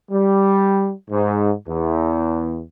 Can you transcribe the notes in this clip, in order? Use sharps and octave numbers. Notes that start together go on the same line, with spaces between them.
G3
G#2
E2